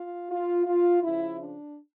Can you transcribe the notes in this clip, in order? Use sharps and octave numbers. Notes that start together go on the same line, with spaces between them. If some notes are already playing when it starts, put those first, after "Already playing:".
Already playing: F4
F4
F4
C#3 F3 E4
D4